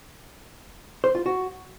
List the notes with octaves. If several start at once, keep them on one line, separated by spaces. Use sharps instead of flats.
C5
F4
F#4